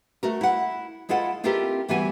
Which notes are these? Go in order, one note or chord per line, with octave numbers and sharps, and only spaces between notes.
A3 F#4 A#4
E4 F#5
G#3 E4 F4 A4 F#5
C4 E4 F4 G4 A4 A#4
D2 E3 G3 B3 F#4 G#5